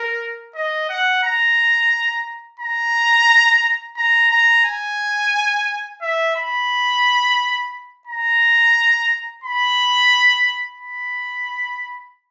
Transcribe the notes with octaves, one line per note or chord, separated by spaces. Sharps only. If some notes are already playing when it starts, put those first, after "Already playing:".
Already playing: A#4
D#5
F#5
A#5
A#5
A#5
A#5
G#5
E5
B5
A#5
B5
B5